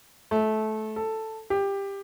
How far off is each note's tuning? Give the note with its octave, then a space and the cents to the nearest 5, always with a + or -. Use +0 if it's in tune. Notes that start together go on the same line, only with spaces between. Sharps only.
A3 -20
A4 +5
G4 +15